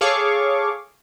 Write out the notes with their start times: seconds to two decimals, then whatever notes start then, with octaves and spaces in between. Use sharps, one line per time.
0.01 G#4 A4 C#5 F5 C#6 D6